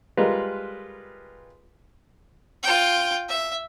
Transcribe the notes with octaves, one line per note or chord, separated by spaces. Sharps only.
G3 G#3 F4 A#4 B4
F4 G5
E5